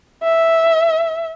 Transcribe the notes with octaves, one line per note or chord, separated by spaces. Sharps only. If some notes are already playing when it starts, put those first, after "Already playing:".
E5